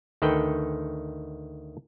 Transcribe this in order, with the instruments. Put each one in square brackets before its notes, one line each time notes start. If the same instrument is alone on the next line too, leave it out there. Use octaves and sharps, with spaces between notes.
[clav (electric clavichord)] D2 D#3 A4 B4 G5